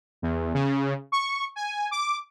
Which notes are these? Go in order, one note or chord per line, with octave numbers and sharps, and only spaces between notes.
E2
C#3
C#6
G#5
D6